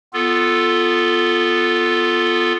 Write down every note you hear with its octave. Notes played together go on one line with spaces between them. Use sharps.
B3 F4 A4